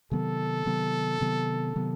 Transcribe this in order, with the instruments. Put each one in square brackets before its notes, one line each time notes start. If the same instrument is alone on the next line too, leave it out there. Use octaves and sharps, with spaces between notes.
[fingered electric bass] C3 D#3 F#3 B3 [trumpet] A4
[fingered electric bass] C3 D#3 F#3 B3
C3 D#3 F#3 B3
C3 D#3 F#3 B3